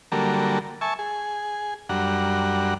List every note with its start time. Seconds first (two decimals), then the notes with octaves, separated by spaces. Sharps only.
0.12 D3 F#3 G3 A#3 A4 A#4
0.81 E5 G#5 A5 C#6
0.99 G#4
1.89 F#2 G3 D4 F#5 A#5